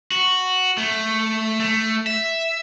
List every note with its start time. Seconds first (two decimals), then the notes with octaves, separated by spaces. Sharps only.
0.12 F#4
0.78 A3
1.60 A3
2.07 E5